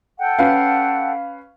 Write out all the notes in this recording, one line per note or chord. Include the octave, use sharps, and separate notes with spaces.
A4 F#5 G5
C#4 B4 F5